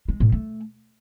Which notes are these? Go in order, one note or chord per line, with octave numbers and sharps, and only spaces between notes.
G#3
A2
A3